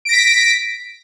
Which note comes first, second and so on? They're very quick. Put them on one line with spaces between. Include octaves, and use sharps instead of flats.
D7 A#6 B6